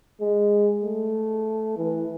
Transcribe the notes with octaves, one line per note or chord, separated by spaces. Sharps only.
G#3
A3
E3